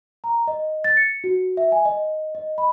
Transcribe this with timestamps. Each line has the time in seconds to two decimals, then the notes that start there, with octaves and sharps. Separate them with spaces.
0.24 A#5
0.47 D#5
0.84 A6
0.97 C#7
1.24 F#4
1.57 E5
1.72 G#5
1.85 D#5
2.35 D#5
2.58 B5